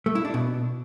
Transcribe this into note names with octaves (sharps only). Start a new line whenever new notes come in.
A3
E4
D4
B2